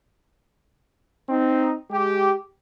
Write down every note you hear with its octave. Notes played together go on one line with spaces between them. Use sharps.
C4 D#4
G#3 G4